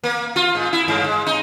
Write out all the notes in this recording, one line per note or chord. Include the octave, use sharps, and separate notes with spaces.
A#3
F4
G#2
E4
G2
G#3
D#4